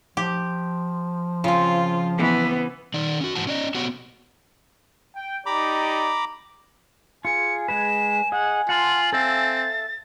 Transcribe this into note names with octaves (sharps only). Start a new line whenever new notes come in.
F3 G4
C#3 C4 F4
E3 B3
D#3 D#4 D5
C#4 F#4
G#2 E3 F#4 A5
C#4 D5 D#5
B3 F#4 G4 C#5 F#5
G5
D#4 G4 D5 A#5 B5 D6
F4 G#4 G#5 C#7
G#3 G#4 B4 E7
G#4 D#5 F#5
F4 F#5 A5 C6 F#7
C4 A4 E5 F5 A6